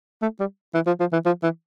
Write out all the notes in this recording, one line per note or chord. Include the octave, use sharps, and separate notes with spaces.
A3
G3
E3
F3
F3
E3
F3
E3